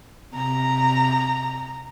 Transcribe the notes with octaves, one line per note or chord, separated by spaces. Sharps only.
C3 A#5